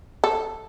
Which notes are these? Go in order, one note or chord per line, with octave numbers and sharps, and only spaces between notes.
A4